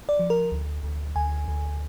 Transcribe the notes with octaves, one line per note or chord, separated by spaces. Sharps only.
D5
F3
A#4
D2
D2
D2 G#5
D2